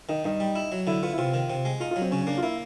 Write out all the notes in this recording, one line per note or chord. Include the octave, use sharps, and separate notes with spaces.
D#3 D#4
G2 D#4
G3
E4
F#3
D3 E4
B3 F4
E4
C3 F4
D#3
C3
G#3
D#4 F4
F4
F#3
C4
C#3 C#4
C#4
A#3 D4
F4
A#3 E4